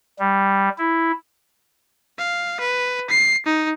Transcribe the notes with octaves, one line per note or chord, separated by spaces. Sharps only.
G3
E4
F5
B4
C7
D#4